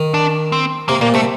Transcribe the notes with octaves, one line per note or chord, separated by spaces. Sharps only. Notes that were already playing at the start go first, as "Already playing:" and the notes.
Already playing: D#3
D4
C4
C3 A#3
A#2 A#3
C3 A3